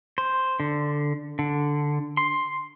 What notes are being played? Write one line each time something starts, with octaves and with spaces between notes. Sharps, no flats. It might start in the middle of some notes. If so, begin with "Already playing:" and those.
C5
D3
D3
C6